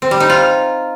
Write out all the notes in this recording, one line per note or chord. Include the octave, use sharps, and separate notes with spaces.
C4
G3
D#4
F4